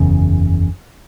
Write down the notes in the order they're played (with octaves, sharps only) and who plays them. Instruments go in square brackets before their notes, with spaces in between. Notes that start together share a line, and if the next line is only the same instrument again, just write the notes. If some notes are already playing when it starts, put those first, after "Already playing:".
Already playing: [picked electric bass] F#1 E2 C#3